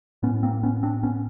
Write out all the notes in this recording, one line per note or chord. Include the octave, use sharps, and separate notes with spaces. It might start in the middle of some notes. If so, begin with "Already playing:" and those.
A2 B3 C#4
A#3 C4
B3 C#4
C4 D4
B3 C#4